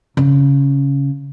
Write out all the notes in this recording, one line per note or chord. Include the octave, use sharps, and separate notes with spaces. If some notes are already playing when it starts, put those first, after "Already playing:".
C#3